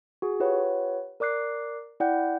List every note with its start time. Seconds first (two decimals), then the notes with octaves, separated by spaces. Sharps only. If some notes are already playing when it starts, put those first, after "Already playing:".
0.22 F#4 G#4
0.40 F4 G4 B4 C#5 F#5
1.20 A#4 D5 D6 F#6 C7
2.00 E4 D5 F#5 G5 G6